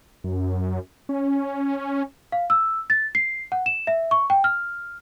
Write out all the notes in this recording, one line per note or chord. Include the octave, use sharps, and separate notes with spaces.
F#2
C#4
F5
E6
A6
C7
F#5
E7
E5
C#6
G5
F6